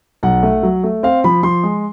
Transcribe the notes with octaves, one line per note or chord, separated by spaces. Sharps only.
B1 F#5
A3
F#3
A3
C4 F5
F3 B5
F3 C6
G#3